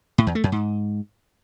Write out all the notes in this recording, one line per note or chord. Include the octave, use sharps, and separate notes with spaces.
A2
E2
A3
F#2
G#2